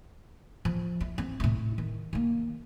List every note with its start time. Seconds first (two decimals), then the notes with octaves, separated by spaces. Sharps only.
0.65 F3
1.00 E4
1.18 C4
1.40 A2 E4
1.78 D#3
2.13 D#3 A#3